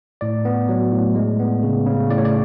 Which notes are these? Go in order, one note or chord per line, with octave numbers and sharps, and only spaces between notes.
A2 D5
B3
F#3
A2
G#3
B3
C#3
C#3
A2 D5
C#5
D5